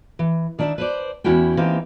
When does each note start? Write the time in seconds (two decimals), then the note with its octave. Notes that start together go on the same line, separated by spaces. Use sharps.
0.19 E3
0.59 D#3 D4 D5 E5
0.78 B4 C5 D5
1.24 E2 C#4 E4 F#4 G5
1.57 E3 A#3 C4 D#4 G4